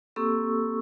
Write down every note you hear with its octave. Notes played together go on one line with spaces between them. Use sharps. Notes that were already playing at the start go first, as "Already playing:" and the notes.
A#3 C4 G4 A4 C#6 E6